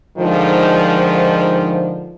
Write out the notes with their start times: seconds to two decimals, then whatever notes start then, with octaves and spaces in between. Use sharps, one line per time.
0.17 G#2 D3 D#3 F3